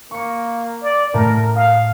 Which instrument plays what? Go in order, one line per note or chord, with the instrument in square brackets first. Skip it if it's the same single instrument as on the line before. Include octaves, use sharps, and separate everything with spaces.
[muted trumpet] A#3 [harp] C#6 C#7
[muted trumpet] D5
[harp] A2 A3 [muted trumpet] A#4
[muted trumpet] F5 [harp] D#6 C7